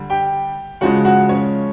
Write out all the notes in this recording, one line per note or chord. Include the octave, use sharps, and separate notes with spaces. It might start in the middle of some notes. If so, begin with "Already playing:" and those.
Already playing: D3 G3
G4 G5
C#3 F3 G#3 F#4 F#5
F#4 F#5
C#4 C#5